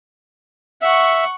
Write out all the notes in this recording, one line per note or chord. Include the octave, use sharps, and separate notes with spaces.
E5 F#5 C#6